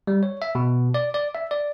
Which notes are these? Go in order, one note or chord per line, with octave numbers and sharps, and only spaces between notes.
G3
C#5
E5
B2
D5
D5
E5
D5